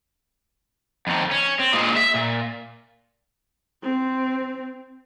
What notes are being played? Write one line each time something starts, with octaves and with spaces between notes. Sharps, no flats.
F2 D#3
C#4
C4
A#2 G#3
E5
A#2
C4